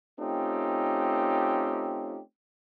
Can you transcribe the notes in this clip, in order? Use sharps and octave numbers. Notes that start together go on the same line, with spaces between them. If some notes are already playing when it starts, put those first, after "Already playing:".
A3 C4 C#4 D#4 F4 G4